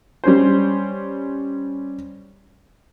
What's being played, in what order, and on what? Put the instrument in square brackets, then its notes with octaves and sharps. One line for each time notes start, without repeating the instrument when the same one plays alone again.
[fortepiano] G3 C#4 C5